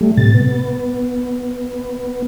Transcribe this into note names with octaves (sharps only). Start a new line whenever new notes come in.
G3 A3
A2 C3 A6
B3